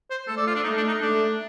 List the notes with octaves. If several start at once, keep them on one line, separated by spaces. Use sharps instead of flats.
C5
A3 A4
D5
F4
D4
A3 D#4
D4
D#4
A3 D4